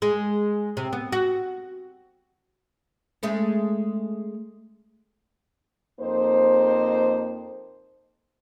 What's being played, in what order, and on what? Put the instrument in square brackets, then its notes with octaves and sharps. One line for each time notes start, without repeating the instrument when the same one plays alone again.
[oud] G#3
C3
B3
F#4
G#3 A3 C#4
[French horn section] F2 A#3 D#4 C5